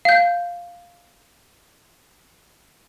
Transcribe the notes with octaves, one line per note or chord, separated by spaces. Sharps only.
F5 G6